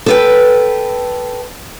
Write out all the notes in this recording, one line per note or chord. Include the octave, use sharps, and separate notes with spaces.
A4 B4 G5